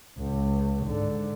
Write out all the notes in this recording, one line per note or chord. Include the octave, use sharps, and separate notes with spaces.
C#2
G#2 D3